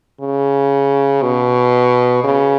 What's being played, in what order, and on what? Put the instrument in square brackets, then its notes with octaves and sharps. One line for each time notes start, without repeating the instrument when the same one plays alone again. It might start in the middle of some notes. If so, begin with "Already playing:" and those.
[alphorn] C#3
B2
C#3